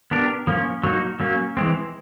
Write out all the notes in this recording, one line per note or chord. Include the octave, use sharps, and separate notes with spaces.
B3 D4 G4 A#4
F3 A#3 C#4
F#3 A#3 D#4 F#4
F#3 A#3 C#4
E3 G#3 C4